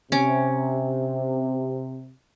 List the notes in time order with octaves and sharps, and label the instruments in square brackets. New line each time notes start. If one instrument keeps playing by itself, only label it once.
[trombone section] C3 [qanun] C#4 D6